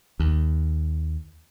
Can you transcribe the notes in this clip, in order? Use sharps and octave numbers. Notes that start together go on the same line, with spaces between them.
D#2